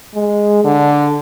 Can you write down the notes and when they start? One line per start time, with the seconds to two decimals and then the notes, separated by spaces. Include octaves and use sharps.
0.14 G#3
0.64 D3